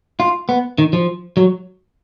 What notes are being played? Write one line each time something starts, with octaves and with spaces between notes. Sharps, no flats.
F4
B3
D#3
F3
F#3